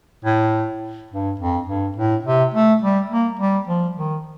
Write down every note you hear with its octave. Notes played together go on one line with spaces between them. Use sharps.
A2
G2
F2
G2
A2
C3
A3
G3
A#3
G3
F3
D#3